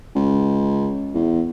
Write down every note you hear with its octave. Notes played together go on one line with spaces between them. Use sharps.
C#2
E2